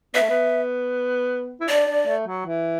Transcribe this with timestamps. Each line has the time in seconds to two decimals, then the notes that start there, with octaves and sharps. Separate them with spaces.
0.15 B3 E5
0.22 A3
0.30 B3
1.61 E4
1.69 D4 D5
1.88 D4
2.07 A3
2.27 F#3
2.46 E3